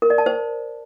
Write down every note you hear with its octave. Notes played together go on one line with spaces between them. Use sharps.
A#4
D5
A5
C5